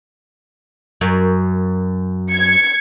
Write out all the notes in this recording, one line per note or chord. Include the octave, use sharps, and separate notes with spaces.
F#2
G#6 C#7